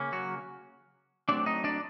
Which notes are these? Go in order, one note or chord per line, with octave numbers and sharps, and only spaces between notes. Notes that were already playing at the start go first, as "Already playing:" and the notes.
Already playing: C#3 A#3 C#4
F#3 F#4
F#3 A3 C4 D4 D5
D#4 D#5
D4 D5